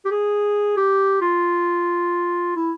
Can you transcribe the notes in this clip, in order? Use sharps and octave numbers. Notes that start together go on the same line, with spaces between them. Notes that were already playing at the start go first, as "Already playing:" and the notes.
G4
G#4
G4
F4
E4